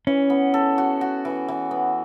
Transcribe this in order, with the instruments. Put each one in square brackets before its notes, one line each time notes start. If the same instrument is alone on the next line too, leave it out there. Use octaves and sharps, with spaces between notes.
[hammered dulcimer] E3 [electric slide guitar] C#4
[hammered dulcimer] B3
A4
F#4
F#4
E3
E3
B3